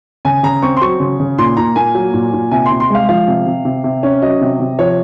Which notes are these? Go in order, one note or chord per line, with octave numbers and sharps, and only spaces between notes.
C#3 G#5
C#3 A#5
C4 C#6
C6
F#3 C#6
C#3
C#3
A#2 C6
A#2 A#5
A#3 G#5
F#3
A#2
A#2
C3 G#5
C3 C6
C6
G#3 F5
F3 F5
C3
C3
C3
C3
C#4
F#3 D#5
C3
C3
F3 C#5